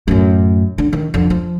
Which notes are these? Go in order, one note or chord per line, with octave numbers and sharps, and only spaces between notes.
F#2 A2
D3
D#3
F2 D3
F3